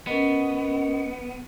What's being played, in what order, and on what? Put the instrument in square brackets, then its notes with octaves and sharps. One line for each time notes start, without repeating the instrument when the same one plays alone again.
[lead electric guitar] B3 [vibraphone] C#4 A#4 D#5